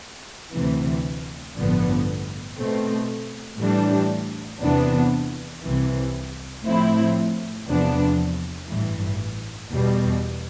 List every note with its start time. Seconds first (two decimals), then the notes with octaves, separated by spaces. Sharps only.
0.54 D2 C3 E3
1.56 A1 G2 D3 F3 B3
2.58 B2 A3 C4
3.60 A2 E3 G3 D4
4.61 E2 C3 E3 B3 D4
5.64 C2 C3 E3
6.65 A2 F3 C4 E4
7.67 E2 C3 F3 B3 D4
8.69 A1 G2 E3
9.71 E2 B2 G3